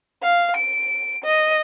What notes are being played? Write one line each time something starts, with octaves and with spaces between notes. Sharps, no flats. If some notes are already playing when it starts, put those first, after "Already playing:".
F5
D7
D#5